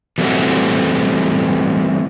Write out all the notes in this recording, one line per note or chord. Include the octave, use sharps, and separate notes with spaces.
E3 G3 A3 C4 F#4